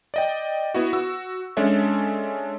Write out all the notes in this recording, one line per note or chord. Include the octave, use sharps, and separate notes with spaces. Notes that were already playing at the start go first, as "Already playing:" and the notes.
D5 D#5 G5
B3 E4 F#4
F#4 E6
G#3 C#4 D4 A4 E5